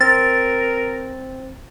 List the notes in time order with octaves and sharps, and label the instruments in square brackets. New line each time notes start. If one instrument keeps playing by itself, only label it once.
[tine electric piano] C4 [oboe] A#4 [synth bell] A6